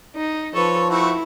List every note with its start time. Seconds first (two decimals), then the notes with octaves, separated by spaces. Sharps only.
0.16 D#4
0.55 F3 A4 B4 C#5
0.90 A3 C4 E4 F#4